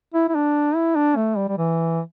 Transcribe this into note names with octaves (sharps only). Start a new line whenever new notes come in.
E4
E4
D4
E4
D4
A3
G3
G3
E3